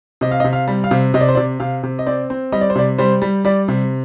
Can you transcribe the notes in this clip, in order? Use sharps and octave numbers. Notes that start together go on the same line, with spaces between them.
C3 D#5
F5
D#5
C3
F5
G3
F5
C3
C3 D#5
D5
C5
C3 D5
C3 F5
C3
D#5
C4 D5
C4
G3 D#5
D5
C5
C3 D5
G3 C5
G3
G3 D5
C3